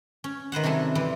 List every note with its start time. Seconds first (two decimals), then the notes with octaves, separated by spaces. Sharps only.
0.24 C#4
0.52 D#3 B4 C5 F#5
0.64 C3 F#3 G3 A4 G#5
0.95 E3 G3 C4